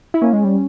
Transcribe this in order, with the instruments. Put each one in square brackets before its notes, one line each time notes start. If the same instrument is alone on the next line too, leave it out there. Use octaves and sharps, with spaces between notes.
[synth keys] E4
[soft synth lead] A#3 [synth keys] C#4
[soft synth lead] G#3
G3